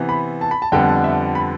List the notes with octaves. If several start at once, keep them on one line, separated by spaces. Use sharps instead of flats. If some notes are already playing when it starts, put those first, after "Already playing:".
Already playing: C3 E3 B3
B5
A5
B5
A5
F2 D3 G3 B3 G5
A5
E5
B5